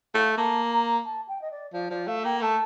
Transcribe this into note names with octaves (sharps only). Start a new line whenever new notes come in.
A3 F5
A#3 A5
A#5
A5
G5
D#5
D5
F3 D5
F3 D5
A3 F5
A#3 G5
A3 A5